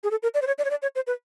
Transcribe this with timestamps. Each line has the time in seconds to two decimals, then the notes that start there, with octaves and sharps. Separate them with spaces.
0.04 G#4
0.11 A4
0.23 A#4
0.34 D5
0.42 C5
0.47 C#5
0.58 D5
0.65 C#5
0.70 D5
0.82 C#5
0.95 C5
1.07 B4